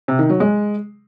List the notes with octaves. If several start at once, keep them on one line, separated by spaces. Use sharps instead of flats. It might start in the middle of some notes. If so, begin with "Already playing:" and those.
C3
D#3
F#3
G#3